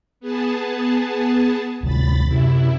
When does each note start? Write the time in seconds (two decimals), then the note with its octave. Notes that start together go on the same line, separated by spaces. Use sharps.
0.20 B3 G#4 A5
1.83 D2 C3 D#3 B5 A6
2.27 F#2 C3 E4